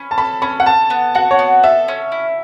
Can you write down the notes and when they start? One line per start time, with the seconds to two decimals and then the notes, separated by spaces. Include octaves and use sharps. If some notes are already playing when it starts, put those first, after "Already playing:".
Already playing: C#4 B5
0.11 A5
0.18 A4 B5
0.42 C#4 B5
0.60 F#5
0.66 A4 A5
0.90 B3
1.15 F#4 F#5
1.31 C#5
1.39 B3
1.63 A4 E5
1.88 C#4
2.12 E4